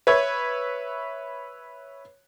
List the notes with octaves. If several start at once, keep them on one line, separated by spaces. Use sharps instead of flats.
B4 C#5 E5 G#6